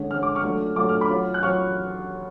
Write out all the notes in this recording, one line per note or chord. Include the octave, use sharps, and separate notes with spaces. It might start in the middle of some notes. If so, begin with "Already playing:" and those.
Already playing: D3 G#3 C#4
D3 G#3 C#4 F6
D6
C#6 F6
F#3 A3 D4 F4
F#3 A3 D4 F4 D6
F6
B5 D6
F#3 C#4 F4
F#6
F#3 C#4 F4 C#6 F6